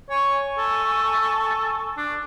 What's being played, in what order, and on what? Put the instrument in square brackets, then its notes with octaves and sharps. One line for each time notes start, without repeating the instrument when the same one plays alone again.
[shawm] C#5 [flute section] G#5 C#6
[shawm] A4
D4